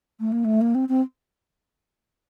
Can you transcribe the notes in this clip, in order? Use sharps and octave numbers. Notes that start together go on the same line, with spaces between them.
A3
A#3
A3
A#3
C4
C4